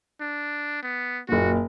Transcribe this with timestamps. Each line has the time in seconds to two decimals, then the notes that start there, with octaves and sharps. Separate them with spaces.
0.21 D4
0.83 B3
1.29 F#1 A#2 F#4